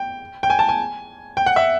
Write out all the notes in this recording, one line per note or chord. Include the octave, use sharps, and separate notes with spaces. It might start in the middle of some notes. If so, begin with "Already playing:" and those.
Already playing: G5
G5
G#5
A5
G#5
G5
F#5
E5